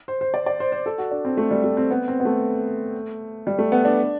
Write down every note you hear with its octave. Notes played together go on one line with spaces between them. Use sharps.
C5
C5
D5
D5
C5
C5
A4
F#4
D4
C4
A3
G3
A3
C4
B3
C4
B3
A3
G3
A3
B3
D4